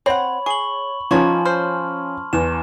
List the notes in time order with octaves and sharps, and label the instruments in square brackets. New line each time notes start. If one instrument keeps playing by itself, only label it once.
[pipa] C4 F#5 [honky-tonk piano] C#5 [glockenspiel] B5
[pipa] G#4 [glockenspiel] C#6 F#7
[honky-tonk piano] F3 C#4 [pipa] B3 D#4 C#5 [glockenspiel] A5 C6
[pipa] C5 [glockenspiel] F6
[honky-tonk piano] E2 [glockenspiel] E7